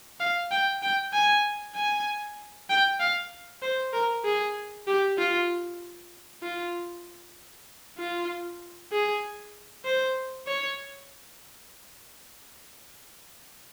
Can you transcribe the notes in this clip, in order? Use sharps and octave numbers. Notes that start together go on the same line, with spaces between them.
F5
G5
G5
G#5
G#5
G5
F5
C5
A#4
G#4
G4
F4
F4
F4
G#4
C5
C#5